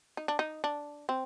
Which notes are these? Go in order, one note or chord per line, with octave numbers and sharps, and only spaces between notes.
D#4
D4
D#4
D4
C4